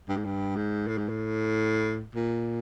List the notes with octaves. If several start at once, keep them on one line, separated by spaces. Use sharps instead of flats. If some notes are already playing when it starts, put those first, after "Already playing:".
G2
G#2
G2
G#2
A2
G#2
A2
A#2